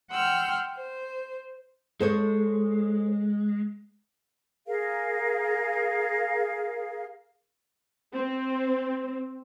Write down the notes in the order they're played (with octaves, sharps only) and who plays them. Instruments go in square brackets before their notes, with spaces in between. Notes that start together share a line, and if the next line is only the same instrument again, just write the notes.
[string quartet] F#5 G5 C6 E6 F6 G6
C5
[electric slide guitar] G#3 [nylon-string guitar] A4 C5 C#5
[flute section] G#4 A#4 F5
[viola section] C4